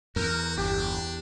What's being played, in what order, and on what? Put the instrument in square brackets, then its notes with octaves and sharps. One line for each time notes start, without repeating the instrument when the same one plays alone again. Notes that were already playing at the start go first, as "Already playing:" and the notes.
[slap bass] E2 [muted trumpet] F#4 [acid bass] A#4
[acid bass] G1 [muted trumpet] D4 [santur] G4